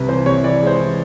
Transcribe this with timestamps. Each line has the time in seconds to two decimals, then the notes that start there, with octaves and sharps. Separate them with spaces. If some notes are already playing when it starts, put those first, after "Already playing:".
Already playing: C2 C3 B4
0.09 E3 C5
0.26 C3 C#5
0.43 E3 D5
0.61 G#3
0.67 C5
0.79 E3